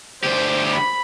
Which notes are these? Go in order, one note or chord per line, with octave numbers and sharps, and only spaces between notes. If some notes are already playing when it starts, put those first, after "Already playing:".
D2 G4 C5
B5